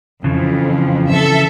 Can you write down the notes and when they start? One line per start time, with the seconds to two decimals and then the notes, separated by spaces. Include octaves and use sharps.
0.24 F2 C#3 E3 F3
1.10 A4 E5